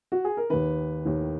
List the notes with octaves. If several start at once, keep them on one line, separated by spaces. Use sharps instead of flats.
F#4
G#4
A#4
D#2 D#3 B4
D#2 D#3